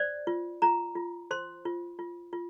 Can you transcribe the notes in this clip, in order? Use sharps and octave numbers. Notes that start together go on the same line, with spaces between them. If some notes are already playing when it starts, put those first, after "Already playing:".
Already playing: C5 D5
F4
F4 A#5
F4
C5 C6
F4
F4
F4